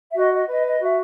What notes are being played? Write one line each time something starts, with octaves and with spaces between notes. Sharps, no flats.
E5
F#4 D#5
D#5
B4 D#5
D#5
F#4 E5